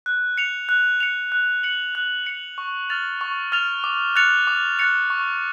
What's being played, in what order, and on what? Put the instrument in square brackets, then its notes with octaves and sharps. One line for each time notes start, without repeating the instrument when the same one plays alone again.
[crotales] F#6
C#7 F7
F#6
C#7 F7
F#6
C#7 F#7
F#6
C#7 F#7
C#6
F6 A6 F7
C#6
F6 A6 F7
D6
F#6 A6 C#7 F7
D6
F#6 A6 C#7 F7
C#6